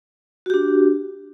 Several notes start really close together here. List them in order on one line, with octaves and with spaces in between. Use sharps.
F#4 G4 D4